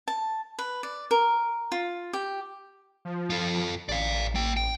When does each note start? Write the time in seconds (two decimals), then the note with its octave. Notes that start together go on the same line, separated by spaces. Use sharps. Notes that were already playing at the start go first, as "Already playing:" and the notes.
0.08 A5
0.59 B4
0.83 D5
1.11 A#4
1.72 F4
2.13 G4
3.05 F3
3.30 F4 A4
3.89 A1 D5 F5
4.35 A#3 G5
4.57 G5